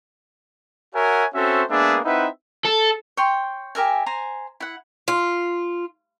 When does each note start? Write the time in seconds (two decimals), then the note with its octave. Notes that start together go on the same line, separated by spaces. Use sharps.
0.94 F#4 A#4 C#5 E5 F#5 G#5
1.34 C4 C#4 F#4 A4 C5 E5
1.69 G#3 A#3 B3 D4 G#4 E5
2.04 C4 D#4 E4 B4 E5 F#5
2.65 A4
3.17 C#5 G5 C6
3.75 G4 A#4 E5 G#5
4.06 C5 G#5 A#5
4.60 E4 F#5
5.08 F4